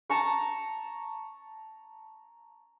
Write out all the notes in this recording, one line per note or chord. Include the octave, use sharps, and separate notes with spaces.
A5 A#5 C#6